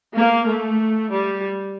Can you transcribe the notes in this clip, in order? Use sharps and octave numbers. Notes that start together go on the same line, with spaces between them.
A#3
A3
G3